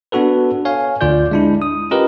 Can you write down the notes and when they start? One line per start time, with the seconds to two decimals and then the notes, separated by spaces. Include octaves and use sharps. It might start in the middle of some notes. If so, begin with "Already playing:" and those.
0.12 B3 D4 F#4 A4 B4
0.65 C#5 F5 G#5
1.01 D2 D3 F4 D5 G6
1.31 G#3 D4 E4
1.62 D#6
1.91 C#4 F4 G4 A#4 B4 D#5